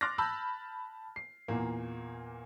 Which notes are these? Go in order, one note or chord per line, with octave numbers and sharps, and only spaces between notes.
C6 D6 F6 F#6 A6 A#6
A5 B5 E6 G6
C7
E2 A#2 A#3